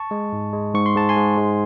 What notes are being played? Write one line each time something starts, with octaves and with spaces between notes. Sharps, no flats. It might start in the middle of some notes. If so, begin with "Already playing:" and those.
Already playing: A5 C#6
G#3
G#2
G#3
G#2 C#6
C6
G#2 A5
G#5 C6
G#2
G#3